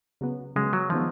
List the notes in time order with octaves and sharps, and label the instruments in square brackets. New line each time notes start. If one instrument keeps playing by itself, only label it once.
[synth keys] C#3 F#3 B3
[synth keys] C#3 F#3 B3 [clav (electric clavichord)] G#3
[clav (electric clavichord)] F#3
[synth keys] D#3 G#3 B3 [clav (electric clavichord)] F3